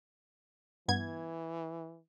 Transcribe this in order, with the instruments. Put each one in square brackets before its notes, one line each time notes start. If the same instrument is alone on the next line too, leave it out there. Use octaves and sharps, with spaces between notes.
[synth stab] G2 B3 G#6 [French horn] E3